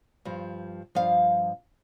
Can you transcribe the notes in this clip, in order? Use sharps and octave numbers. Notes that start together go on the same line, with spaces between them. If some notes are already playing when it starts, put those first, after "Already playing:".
G2 F3
G2 F3 F5